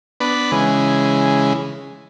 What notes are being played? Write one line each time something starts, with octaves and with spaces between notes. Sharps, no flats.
B3 D4 B4
C#3 E3 G#3